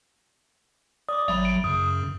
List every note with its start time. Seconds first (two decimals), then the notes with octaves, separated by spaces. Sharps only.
1.09 D5 D6 D#6
1.28 G#1 F#3 E5 B5
1.45 D7
1.64 F#2 C#3 D#6